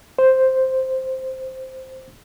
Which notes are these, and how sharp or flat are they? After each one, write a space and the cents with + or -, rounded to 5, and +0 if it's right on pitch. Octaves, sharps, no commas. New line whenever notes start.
C5 +0